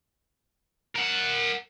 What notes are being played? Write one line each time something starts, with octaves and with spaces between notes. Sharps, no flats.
A#4 F#5